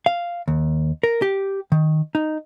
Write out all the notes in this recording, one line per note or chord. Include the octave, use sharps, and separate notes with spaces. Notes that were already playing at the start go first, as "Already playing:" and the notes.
F5
D#2
A#4
G4
D#3
D#4